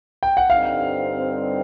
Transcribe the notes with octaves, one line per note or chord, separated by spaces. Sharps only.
G5
F#5
G2 D3 G3 C4 D#4 F5